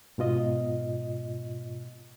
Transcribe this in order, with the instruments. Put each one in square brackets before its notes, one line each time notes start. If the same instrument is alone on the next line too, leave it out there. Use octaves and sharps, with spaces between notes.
[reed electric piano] G#2 B2 F4 D#5